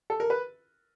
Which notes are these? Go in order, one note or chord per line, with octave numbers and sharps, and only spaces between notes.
A4
A#4
B4